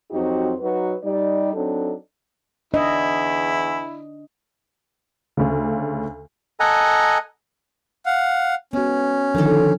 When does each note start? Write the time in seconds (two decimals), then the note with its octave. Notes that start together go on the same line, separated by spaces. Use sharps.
0.11 F2 F#3 C4 D#4 F#4 G4
0.60 F#3 D#4 F#4 B4
1.03 G3 D#4 D5
1.54 F#3 C4 D4 D#4 A4
2.74 E2 D4 E4 D#5
5.37 D2 C#3
6.60 A4 D#5 F#5 G#5 A#5
8.06 F5 F#5
8.73 G#3 B3 C#4 F#4
9.35 D3 D#3 F3 D#4 A4